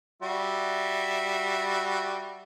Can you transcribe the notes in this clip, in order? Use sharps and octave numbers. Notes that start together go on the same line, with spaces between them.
G3 F#4 E5